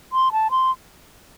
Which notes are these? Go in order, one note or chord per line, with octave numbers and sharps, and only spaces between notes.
C6
A5
C6